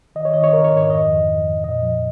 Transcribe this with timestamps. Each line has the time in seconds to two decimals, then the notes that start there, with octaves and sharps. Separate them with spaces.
0.15 D#3 D#5
0.25 C#5
0.33 D#3 D#5
0.43 C#5
0.52 D#3 A#4
0.64 C#5
0.71 G#2
0.77 C#5
0.89 F2 D#5
1.08 F2
1.27 F2
1.46 F2
1.64 A#2 D#5
1.83 F3